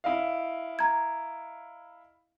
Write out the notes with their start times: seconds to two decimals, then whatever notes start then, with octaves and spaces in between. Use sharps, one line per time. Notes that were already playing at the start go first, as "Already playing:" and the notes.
0.04 E4 D#5 F5
0.79 A#5 G#6